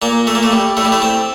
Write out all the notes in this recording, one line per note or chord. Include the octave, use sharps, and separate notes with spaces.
A#2 A#3
A3
A#3
A3
G3
A2 A3
G3
A3
C4